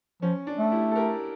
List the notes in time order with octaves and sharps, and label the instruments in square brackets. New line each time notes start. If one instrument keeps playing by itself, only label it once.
[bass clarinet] F3 [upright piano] C#4
[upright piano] D4
[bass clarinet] A3
[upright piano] E4 G4
A4
G4 A#4